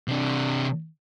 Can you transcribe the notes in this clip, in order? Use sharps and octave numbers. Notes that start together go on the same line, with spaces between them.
C3 D4